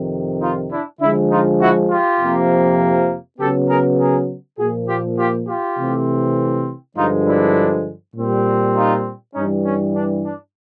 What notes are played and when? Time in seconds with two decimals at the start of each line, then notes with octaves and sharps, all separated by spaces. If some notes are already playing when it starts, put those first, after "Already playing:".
Already playing: F2 C3 D#3
0.41 D#4 F4
0.71 D4 E4
1.01 D3 F3 G#3 D4 E4
1.30 D#4 F4
1.60 E4 F#4
1.90 F4 G4
2.20 F2 C3 F3 A#3
3.39 C#3 F#3 B3 G4 A4
3.69 G#4 A#4
3.99 G#4 A#4
4.58 A#2 F3 A#3 F#4 G#4
4.88 F4 G4
5.18 F4 G4
5.47 F4 G4
5.77 C3 E3 A3 C4
6.96 G2 D3 F3 G#3 D#4 F4
7.26 D4 E4
8.16 A#2 G3 C4
8.75 D#4 F4
9.35 G2 E3 G3 C#4 D#4
9.64 C#4
9.94 D4
10.24 D4